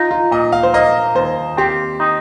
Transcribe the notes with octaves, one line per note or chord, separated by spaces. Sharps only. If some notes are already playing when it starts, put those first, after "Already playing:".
Already playing: D#4 F4
F4
A#2 D#5
F5
C5
A#3 D#5
D#2 C5
C4 G4
D#4